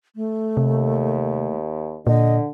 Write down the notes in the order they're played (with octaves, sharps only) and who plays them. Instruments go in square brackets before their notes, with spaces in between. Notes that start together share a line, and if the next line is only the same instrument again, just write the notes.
[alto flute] A3
[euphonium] D#2 [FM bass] C3
[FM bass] A#2 [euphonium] D3 [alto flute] D#5